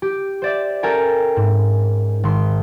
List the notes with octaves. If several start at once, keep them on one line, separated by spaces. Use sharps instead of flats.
G4
C5 D5 E5
C#4 A4 A#4 G5 G#5
G#2
G#1 C6